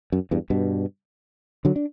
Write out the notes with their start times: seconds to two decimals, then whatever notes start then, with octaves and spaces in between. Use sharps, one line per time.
0.12 F#2
0.31 E2 G2
0.50 G2 B2
1.65 D3 F#3
1.76 D4